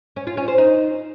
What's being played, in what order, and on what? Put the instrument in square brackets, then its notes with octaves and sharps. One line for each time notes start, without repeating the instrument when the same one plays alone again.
[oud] C#4
F4
C#4
C5
D#4